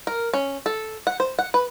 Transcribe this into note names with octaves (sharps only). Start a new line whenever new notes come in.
A#4
C#4
A4
F#5
C5
F#5
B4